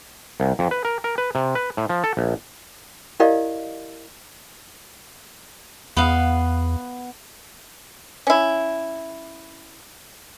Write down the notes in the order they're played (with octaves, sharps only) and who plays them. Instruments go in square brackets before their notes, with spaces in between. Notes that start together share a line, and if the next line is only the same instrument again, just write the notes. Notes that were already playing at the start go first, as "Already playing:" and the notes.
[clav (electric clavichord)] C2
F2
B4
A#4
A#4
B4
C3
B4
A2
F3
A4
A#1
[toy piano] E4 G4 A#4 D5 D#5 F5
[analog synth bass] E2 [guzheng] B3 F5
[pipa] C#4 E4